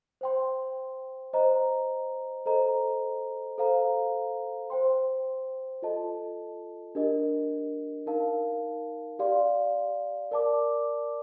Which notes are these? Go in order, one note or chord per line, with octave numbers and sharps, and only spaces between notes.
C5 G5 C6
C5 D#5 A#5
A4 C5 D#5 A#5
A4 C5 F5 A#5
C5 G5 C6
F4 A4 D#5 A5
D4 G4 A#4 D#5
D#4 A#4 F5 A5
G4 D5 F5 C6
A#4 D5 A5 D6